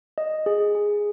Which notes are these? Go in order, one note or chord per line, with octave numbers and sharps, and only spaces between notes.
D#5
G#4
G#4